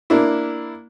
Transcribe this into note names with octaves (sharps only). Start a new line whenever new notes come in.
A#3 D4 E4